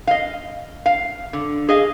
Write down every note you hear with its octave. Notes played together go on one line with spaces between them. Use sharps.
D#5 F5
F5
D3
G#4 D#5 F5